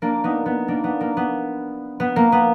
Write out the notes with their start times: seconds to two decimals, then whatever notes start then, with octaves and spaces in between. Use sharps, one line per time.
0.02 A#3 D4
0.24 B3 D#4
0.46 B3
0.68 A#3 D4
0.84 B3
1.01 A#3
1.17 B3
2.00 B3
2.16 A#3
2.32 B3